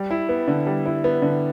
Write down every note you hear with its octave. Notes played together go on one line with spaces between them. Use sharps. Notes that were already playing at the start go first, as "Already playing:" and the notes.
Already playing: G3
E4
B3
D3
G3
E4
B3
D3